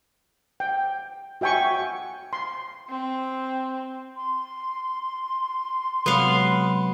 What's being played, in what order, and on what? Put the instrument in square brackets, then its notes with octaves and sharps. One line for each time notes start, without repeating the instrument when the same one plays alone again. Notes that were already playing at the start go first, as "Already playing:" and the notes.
[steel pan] G5
F#4 E5 G5 G#5 C#6
C6
[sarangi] C4
[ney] C6
[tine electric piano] C3 F#3 G#3 [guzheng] B3 F5